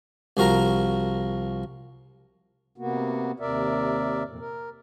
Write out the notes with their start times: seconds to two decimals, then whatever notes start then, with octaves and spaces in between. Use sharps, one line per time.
0.37 C2 F3 F#4 A#4 A#5
2.78 C3 A#3 B3 F#4
3.40 D#2 C3 A#4 D5 E5
4.25 F2 A#2
4.40 A#4